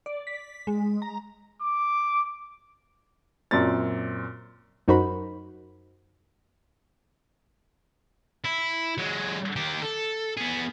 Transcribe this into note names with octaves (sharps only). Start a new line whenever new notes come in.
D5
B6
G#3
A#5
D6
F#2 A#2 C4 D5 A6
F#2 D#4 F#4 A#4 C5 B5
E4
F#3 G#3
D#3 G4
A4
B3 G#4